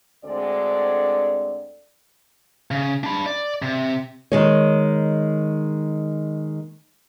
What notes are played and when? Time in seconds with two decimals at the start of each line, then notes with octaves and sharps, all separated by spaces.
0.25 D2 D3 G#3 C4 D5
2.71 C#3
3.04 D4 B5
3.26 D5
3.62 C3
4.32 D#3 G#3 C#5